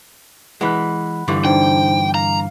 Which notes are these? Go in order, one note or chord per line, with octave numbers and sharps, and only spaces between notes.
E3 G#3 F#5 B5 F#6
G2 D3 E3
D4 D#4 C5 G5
F5 A#5